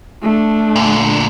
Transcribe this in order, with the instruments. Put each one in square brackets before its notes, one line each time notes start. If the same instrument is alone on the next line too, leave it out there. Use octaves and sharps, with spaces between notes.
[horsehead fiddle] A3 D4
[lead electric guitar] A#2 D3